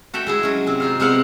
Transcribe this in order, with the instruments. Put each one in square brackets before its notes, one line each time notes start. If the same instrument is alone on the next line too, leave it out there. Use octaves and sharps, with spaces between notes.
[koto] F#4 A4 E5 G5
G#3 E4 G#4
F#3 C#4
C3 C4
D#4 F4 F5
C3 G#3 B3 C4 F5 F#5